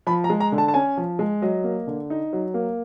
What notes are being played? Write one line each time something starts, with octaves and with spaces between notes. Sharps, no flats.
F3 B5
A#5
G#3
A#5
D3
A5
A5
C#4 G#5
F3
G#3
F#3 D#5
A#3
D3
D#4
F#3
A#3